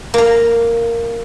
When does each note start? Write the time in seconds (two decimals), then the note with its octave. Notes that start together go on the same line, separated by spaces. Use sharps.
0.14 A#3 A#5